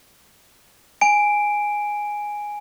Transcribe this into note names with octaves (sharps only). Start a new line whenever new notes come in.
G#5 D7